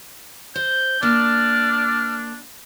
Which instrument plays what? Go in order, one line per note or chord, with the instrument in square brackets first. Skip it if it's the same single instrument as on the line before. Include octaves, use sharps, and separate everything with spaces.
[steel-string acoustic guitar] C5 [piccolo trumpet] G6
[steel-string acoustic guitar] A#3 A5 [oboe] D4 [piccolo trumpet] D5 [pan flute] F6